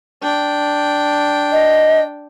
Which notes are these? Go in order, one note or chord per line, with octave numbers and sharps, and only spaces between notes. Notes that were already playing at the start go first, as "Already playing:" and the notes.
D4 G5
D#5